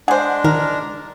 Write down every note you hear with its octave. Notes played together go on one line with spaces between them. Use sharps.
G#3 D4 G#4 C5 F#5
D#3 A#4